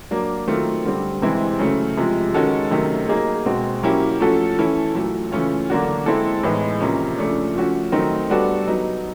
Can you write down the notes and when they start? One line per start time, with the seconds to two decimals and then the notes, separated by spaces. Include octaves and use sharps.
0.11 F#3 A#3 D4
0.47 D#3 F#3 A3 C4 F4
0.85 D3 G3 C4
1.22 C3 E3 G#3 C4 E4
1.59 C#3 F#3 A3
1.97 C3 F3 G#3
2.34 D#3 G#3 C#4 F#4 A4
2.71 C3 D#3 F#3 A3 C#4
3.09 F#3 A#3 D#4 G#4
3.46 B2 G#3 C4
3.83 F#3 A#3 C#4 E4 G4
4.20 F3 A3 C#4 F#4 A4
4.58 E3 A3 C#4 E4 A4
4.95 A#2 F#3 A3
5.32 C#3 E3 A3 C#4 F4
5.70 D3 F#3 A#3 D4 F#4
6.06 G#3 C4 E4 A4
6.43 A2 E3 G#3 B3 D#4
6.80 C3 F3 A#3 C#4
7.18 C#3 F3 A3 D4
7.55 F3 A3 C#4 F#4
7.92 D#3 F#3 A3 C4 D#4
8.30 G3 B3 D4 F#4 A4
8.67 F#3 B3 D#4